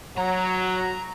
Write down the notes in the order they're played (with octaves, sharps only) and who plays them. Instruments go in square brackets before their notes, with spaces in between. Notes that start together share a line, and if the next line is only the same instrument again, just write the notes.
[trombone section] F#3 [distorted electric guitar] A#5